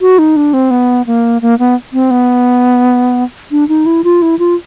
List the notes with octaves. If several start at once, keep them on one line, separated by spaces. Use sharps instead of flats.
F#4
D#4
D4
C4
B3
A#3
A#3
B3
C4
B3
D4
D#4
E4
F4
E4
F4